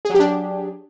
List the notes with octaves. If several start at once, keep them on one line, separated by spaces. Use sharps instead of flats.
F#3 D4 G4 G#4